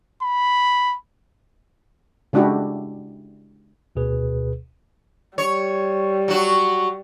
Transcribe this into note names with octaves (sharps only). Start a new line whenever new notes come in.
B5
C#3 G#3 D4 E4 F#4 G4
D2 B2 G#4 B4
G3 C#5
F#3 F#4